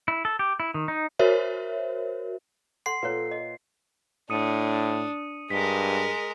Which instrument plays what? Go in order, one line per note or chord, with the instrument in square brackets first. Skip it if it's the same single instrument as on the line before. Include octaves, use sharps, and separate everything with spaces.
[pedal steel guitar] E4
A4
G4
E4
D#3
D#4
[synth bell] F#4 A#4 C5 C#5 E5
[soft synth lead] A4 [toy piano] F#5 C6 [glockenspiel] C7
[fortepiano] A#2 [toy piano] B4 C#5
[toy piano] D#5
[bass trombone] A2 [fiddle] D4 [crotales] D#6 C#7 D#7
[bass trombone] G2 [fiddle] G#3 A#4 [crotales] B6 G7